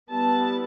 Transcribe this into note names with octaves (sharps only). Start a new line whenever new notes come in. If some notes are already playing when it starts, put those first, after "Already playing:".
G3 B3 E4 A5